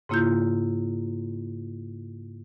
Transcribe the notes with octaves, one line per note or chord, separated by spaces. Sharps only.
G#2 C#3 A#3 E4 F4 G6